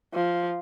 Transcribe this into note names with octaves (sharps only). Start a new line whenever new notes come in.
F3